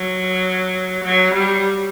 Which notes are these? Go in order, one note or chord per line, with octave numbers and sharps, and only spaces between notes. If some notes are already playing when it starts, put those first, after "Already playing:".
Already playing: F#3
F#3
G3